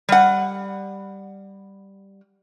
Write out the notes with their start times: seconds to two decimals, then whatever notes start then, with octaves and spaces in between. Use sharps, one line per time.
0.09 G3 F#5